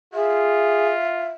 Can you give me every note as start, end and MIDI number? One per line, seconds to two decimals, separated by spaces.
0.14 1.35 65
0.14 0.93 68
0.14 1.30 76